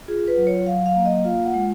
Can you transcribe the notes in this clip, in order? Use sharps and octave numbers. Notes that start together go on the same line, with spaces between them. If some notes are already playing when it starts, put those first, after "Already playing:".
F4 G#4
B4
F#3
C#5
F#3 F5
F5
A#3
D#5
F4 F5
F#5
G#3